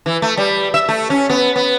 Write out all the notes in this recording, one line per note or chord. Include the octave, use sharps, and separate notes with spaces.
E3
A3
G3
E5
A3
C#4
B3
B3